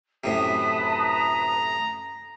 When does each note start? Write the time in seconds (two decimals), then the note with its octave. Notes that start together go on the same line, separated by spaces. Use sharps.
0.24 F#2 A2 C3 B4 A5 D#6
0.82 A#5